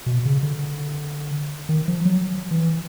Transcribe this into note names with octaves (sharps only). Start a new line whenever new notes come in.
B2
C#3
D3
D#3
F3
F#3
E3